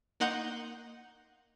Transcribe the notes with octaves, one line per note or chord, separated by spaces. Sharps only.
A#3 D#4 F#5 C6 G6